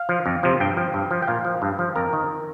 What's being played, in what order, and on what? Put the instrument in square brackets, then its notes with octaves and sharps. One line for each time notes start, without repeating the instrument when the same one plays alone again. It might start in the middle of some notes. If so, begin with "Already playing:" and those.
Already playing: [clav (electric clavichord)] F5
F3
F2
C3 F3
G2 G5
F3
G2
F3
G5
A#2 F5
F3
G2
F3
F2 A#4
D#3